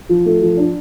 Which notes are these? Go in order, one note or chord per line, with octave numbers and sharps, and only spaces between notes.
F3
A3
F3
D4